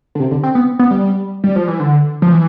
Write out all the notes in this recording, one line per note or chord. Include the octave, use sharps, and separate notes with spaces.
D3
C3
D3
C4
B3
B3
G3
G3
F3
E3
D3
F3
E3